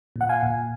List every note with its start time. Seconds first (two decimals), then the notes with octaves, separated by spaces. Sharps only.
0.16 A#2
0.21 F#5
0.29 F5 G#5
0.43 A#2